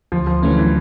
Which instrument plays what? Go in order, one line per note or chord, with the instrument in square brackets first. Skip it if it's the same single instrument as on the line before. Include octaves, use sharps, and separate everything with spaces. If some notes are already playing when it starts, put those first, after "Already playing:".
[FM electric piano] D2 [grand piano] F3
[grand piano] F3
[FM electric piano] D3 F#3 A3 C#4 [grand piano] E3
[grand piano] E3